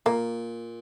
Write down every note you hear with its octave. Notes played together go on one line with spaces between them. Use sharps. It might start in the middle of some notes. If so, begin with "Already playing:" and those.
A#2 A#3